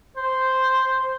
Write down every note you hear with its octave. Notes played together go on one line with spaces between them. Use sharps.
C5